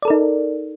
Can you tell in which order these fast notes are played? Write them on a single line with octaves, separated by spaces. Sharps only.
D5 A4 A#4 D#4